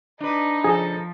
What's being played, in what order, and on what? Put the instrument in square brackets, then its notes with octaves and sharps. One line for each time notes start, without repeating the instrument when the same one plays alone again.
[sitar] D4 B4 [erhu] D#4
[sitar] C#3 A4 [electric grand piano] F3 [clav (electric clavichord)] G#4